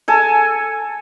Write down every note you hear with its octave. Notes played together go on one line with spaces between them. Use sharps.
A4 G#5